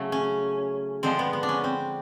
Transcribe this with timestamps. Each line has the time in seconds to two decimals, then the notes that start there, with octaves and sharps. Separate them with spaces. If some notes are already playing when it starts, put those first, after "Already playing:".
Already playing: C#3 F#3 A3
0.12 C#4
1.03 D3 F3 G#3 C4
1.19 B3
1.33 B3
1.43 D4
1.49 C#4
1.64 C4